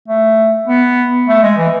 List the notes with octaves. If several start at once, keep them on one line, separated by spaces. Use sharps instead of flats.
A3
B3
A3
G#3
E3